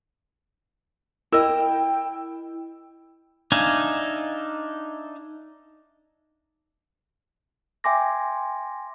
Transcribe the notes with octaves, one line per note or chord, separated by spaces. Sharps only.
E4 A#4 D#5 G5 E6
D4 D#4 E5 F5 G#5
E5 G5 G#5 C6 D6 A#6